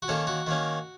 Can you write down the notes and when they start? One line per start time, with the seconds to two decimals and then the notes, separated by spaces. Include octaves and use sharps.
0.02 F#4
0.08 D#3 A#3 C#4 A4
0.27 F#4
0.47 D#3 A#3 C#4